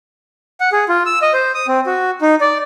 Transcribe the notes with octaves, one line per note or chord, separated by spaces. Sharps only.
F#5
G#4
F4
E6
D#5
C5
D#6
C4
F#4
D#4
D5